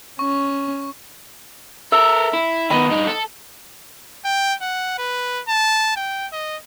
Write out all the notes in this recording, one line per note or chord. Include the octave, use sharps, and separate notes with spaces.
C#4 C#6
A4 A#4 E5
E4
D#3 B3 D#5 B5
G2 D#4
A4
G5
F#5
B4
A5
G5
D#5